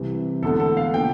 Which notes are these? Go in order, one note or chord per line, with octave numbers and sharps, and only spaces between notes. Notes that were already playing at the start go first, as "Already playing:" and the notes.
Already playing: C2 C3 E3
E1 E2 D3 A3 A4
A4
F5
D3 F3 A#3 G5